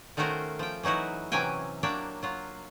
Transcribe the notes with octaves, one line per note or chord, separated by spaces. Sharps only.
D#3 A3 C#4 F#4 A#4 C5
F3 G5
E3 F#3 D#4 E4 F#4
C3 E3 F#3 C#4 G5 G#5
F#3 A#3 D4 C#5 G5
F#3 F4